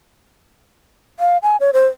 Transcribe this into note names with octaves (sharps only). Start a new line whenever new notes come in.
F5
G#5
C#5
C5